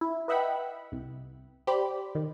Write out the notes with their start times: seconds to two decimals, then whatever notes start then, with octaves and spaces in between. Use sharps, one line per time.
0.01 E4
0.28 B4 D#5 E5 F#5 G5 B5
0.92 C2
1.67 G4 C5 D5 B5
2.15 D#3